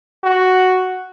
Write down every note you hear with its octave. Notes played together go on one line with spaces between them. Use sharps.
F#4